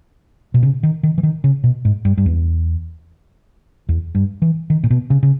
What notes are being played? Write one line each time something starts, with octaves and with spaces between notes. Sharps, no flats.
B2
C#3
D#3
D#3
E3
D#3
C#3
B2
G#2
G2
G2
E2
E2
G2
E3
D#3
A#2
B2
C#3
C#3